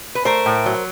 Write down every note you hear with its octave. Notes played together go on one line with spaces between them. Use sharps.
B4
A3 A#4 C5
A2
F#3